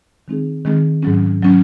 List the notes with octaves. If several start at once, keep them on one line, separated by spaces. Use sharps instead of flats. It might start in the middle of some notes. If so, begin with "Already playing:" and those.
D#3 G#3 C4 D#4 G#4
D#3 G#3 C4 D#4 G#4
G#2 F#3 C#4
F#3 C#4